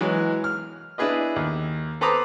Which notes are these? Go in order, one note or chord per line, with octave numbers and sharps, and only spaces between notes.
E3 F#3 G#3
F6
D4 E4 G#4 B4 D#5
D#2
A4 B4 C5 A#5 D6 D#6